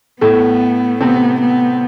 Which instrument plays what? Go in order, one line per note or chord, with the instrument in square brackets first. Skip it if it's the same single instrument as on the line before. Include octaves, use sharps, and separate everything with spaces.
[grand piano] A2 A3 [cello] B3
[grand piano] C3 C4 [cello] B3
[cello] B3